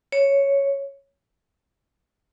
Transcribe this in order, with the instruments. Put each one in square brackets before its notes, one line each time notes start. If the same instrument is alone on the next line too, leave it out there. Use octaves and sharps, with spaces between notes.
[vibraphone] C#5